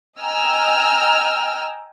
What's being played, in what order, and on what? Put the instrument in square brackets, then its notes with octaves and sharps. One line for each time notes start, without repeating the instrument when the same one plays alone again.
[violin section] D#5 G5 G#5 A#5 E6 F6